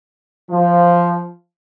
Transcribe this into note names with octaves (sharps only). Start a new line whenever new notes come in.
F3